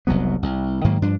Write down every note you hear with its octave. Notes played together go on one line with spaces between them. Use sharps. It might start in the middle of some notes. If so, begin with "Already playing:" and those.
F1 C2 F#3 B3
C2
G#2 D#3 F#3 A#3
G2 F3 D4